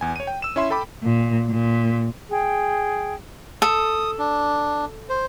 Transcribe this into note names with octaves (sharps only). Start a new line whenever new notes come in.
E2 G#5
C#5 D#7
G5
E6 E7
C#4 E4 E5 C6
A4 G5 B5 D6
A#2
A#2
G#4 G5
A4 D#6
D4
C5